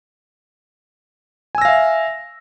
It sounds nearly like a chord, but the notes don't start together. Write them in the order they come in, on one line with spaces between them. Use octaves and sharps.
G#5 E6 A#6 F5 E5